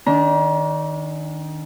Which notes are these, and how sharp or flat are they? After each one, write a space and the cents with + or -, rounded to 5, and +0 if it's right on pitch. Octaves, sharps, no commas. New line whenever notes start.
D#3 -5 D4 -30 A#5 +35